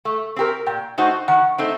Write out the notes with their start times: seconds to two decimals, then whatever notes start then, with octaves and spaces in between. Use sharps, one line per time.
0.05 A3
0.36 C4 G4 A#4
0.66 A#2 G5
0.98 A3 D#4 F#4 C5
1.28 D#3 F#5
1.58 A3 C4 D#4